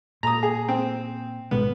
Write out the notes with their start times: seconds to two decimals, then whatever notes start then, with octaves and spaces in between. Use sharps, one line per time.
0.23 A#2 A#5 D#6
0.43 G#4
0.68 C4
1.51 G#1 B2 G#3 B3